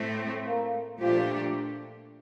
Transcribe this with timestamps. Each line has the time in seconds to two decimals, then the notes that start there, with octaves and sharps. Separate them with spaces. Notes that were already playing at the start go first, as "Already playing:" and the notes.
Already playing: A2 A3 C4
0.46 A#3
1.00 A#2 F3 A3 D4 G4